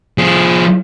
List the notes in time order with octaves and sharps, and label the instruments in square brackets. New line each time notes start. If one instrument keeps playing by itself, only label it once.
[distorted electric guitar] F3 G#4